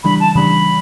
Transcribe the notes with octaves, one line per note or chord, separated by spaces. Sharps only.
C#3 E3 G3 D4 B5
A5
C#3 E3 G3 D4 B5